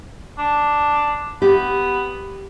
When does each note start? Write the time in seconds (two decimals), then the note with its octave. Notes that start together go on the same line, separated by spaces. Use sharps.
0.38 D4
1.42 B3 G4